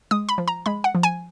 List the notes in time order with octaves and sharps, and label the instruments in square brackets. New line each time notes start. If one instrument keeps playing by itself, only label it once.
[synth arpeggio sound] G#3 D#6
B5
F3
A#5
G#3 B5
F#5
F3
G#5